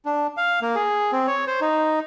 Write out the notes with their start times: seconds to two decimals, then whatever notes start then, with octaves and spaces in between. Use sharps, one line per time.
0.06 D4
0.37 F5
0.62 A#3
0.75 G#4
1.12 C4
1.27 C#5
1.47 C5
1.61 D#4